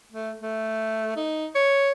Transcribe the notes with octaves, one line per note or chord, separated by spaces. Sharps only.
A3
A3
D#4
C#5